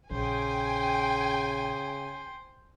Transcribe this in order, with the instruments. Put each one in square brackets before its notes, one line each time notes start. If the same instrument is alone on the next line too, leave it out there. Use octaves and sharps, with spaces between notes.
[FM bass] A#1 [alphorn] C#3 [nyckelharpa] C5 [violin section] G5 G#5